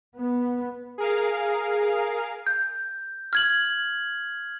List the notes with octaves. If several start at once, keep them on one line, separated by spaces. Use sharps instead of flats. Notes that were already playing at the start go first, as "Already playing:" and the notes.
B3
G#4 A#4 F5
G6
F6 G#6 F#7